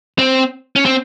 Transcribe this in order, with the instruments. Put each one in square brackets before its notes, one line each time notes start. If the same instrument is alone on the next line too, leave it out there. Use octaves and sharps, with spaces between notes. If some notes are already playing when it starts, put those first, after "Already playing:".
[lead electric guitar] C4
C#4
C4